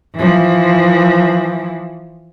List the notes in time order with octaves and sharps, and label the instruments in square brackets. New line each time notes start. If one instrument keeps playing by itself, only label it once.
[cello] E3 F3